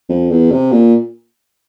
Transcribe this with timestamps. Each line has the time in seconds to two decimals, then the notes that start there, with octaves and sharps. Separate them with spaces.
0.09 F2
0.31 E2
0.52 C3
0.72 A#2